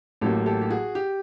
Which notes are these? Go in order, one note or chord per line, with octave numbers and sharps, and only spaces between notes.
A1 A2 F#3 A#3 G4 A4
G4 A4
G4
F#4 G#4
G4